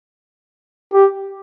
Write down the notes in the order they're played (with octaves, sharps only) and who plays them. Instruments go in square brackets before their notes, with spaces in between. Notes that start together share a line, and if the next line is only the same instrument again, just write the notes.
[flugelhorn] G4